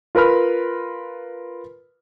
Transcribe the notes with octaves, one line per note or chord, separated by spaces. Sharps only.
F4 A#4 B4 B5 F6